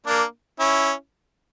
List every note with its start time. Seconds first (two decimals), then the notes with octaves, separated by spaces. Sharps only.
0.06 A#3 D4
0.59 C#4 E4